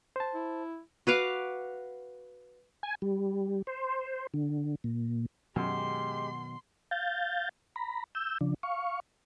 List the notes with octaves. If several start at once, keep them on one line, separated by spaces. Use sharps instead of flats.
C5 A5
E4
F#4 B4 F5 D6
G#5
G3
C5
D3
A#2
F#2 B2 D#3 F#3 G#3 G4 C6
F5 G6 A6
A#5 B5
E6 G6
C#3 F3 D4
F5 C#6